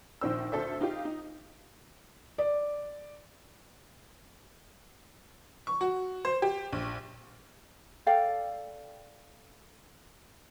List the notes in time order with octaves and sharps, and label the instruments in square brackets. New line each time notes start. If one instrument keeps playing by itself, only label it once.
[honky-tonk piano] A#1 D#3 C5 E6
D2 A4 C5 E5
D#4 F4 G4
D#4
[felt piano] D5
[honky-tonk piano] C#6
F#4
C5
G4
A#1
[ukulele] A4 D5 F5 G5